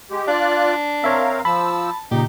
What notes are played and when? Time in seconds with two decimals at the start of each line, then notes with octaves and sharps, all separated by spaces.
0.11 G#3 G4
0.28 D4 F4 D5 F#6
1.04 C4 A#4 C#5 E5 F5
1.45 F3 A5 B5 E6
2.11 A#2 C#3 D#4 G4